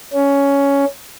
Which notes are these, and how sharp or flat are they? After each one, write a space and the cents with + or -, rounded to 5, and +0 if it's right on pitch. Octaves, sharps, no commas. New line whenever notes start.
C#4 +10